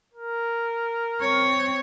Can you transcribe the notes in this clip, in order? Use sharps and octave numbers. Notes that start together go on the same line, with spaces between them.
A#4
C4 C#5